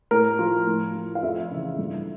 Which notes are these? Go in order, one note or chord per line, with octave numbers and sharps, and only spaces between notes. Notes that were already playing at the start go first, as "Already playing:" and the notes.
A2 A#4
F3
A2
F3
F5
F2 E5
C#3 E3
G2